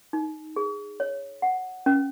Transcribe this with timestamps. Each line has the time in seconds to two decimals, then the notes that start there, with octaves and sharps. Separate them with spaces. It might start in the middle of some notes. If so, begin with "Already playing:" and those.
0.13 D#4
0.56 G#4
1.00 C#5
1.42 F#5
1.86 C#4